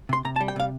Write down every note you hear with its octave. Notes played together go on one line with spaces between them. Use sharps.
C3 C6
C3 A#5
A5
G3
G5
C3 F5